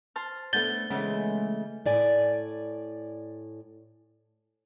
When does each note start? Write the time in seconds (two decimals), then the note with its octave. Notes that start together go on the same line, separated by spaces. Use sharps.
0.16 C5 A5 F6
0.53 A3 B3 D4 G6 A6 G7
0.90 C#3 E3 G#3 A3 B3
1.86 A2 D5 G#5